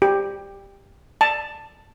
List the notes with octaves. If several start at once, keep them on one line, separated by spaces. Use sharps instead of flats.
G4
A5